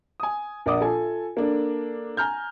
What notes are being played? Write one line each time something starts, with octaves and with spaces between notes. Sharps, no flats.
G#5 D#6
A#1 A#3 D5 F#5 D6 D#6
F4 A4 G#5
A#3 D4 A4
G#5 A#5 F6 G6